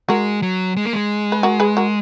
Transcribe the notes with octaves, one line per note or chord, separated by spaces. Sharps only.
G#3 F#4 A#4
F#3
G#3
A#3
G#3
B4
F#4 A#4
G#4 B4
F#4 A#4